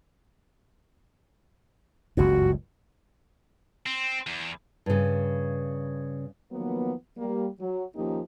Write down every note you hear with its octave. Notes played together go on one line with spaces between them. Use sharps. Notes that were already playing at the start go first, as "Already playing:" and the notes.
F#1 C#2 G2 F#4
C4
E2
G2 C#3
D#3 F3 F#3 A#3 B3
G3 A#3
F#3
D#2 F3 A#3 C#4 D#4 G4